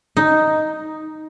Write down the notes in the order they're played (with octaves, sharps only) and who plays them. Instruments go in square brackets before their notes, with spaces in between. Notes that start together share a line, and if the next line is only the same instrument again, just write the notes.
[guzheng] D#4